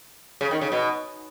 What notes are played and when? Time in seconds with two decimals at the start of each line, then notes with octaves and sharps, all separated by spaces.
0.41 C#3
0.51 D#3
0.61 C#3
0.72 B2